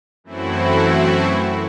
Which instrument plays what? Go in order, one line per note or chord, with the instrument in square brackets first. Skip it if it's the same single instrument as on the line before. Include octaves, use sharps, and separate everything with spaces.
[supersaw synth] F#2 E3 A3 C4 E4 F#4